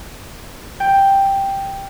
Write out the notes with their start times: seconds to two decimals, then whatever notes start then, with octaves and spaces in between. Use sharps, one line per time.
0.80 G5